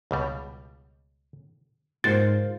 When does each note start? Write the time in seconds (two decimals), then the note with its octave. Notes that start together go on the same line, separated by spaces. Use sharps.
0.11 C#2 B2 G3
2.04 G#2 F4 F#4 A#4 C5 G5 A6